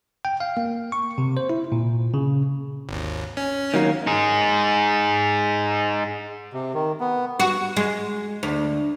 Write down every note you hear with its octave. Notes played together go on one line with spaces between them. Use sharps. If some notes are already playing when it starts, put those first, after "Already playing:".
G5
F5
A#3
C#6
C3
C5
E4
A#2
C#3
G#1 D#2
C#4
D#3 F#3 A#3
D#4 G#4
C3
D#3
B3
F#4
G#3
D2